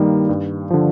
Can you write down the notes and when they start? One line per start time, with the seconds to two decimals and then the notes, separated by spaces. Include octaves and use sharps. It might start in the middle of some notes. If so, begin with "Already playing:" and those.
Already playing: G2 D#3 G3 A#3 D#4
0.29 G2
0.70 D3 F3